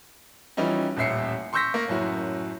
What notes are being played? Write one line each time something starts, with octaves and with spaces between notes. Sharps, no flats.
E3 F3 G3 C#4 D#4 E4
D#1 A1 E5 C7 C#7
C6 C#6 E6 G6 A#6 B6
A#3 C#6 A#6
A1 F#2 E4 F#4